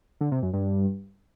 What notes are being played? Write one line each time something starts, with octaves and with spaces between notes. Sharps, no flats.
D3
C3
F#2
G2